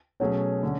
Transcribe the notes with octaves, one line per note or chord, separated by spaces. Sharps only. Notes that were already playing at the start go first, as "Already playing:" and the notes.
B2 F#3 A3 C#4 G#4 C#5
D3 A3 C#4